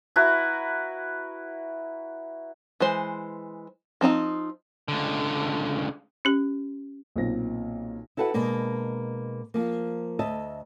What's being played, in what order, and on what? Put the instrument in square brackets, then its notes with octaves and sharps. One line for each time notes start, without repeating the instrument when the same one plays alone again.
[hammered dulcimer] E4 F#4 B4 A#5
[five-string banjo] E3 G#3 C5
F3 C4 D#4 A#5
[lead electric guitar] C#2 D3
[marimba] C#4 G4
[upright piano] B1 A#2 C4 A#6
[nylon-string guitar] E4 F#4 A4 B4 F#5
B2 G#3 A#3 D4
F3 A#3
D2 D#5 E5 A5